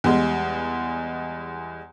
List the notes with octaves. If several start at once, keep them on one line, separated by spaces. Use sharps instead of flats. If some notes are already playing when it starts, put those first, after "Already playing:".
E2 G3 G#3